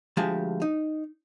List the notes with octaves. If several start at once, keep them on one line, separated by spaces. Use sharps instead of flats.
D2 F3 G#3 G4 G#5 A5
D#4